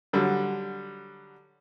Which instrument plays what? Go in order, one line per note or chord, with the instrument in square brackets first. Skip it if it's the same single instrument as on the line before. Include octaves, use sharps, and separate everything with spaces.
[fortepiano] D3 F#3 G3